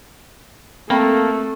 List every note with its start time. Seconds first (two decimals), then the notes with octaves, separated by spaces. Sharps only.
0.90 A3 A#3 C4 A4 G5 B5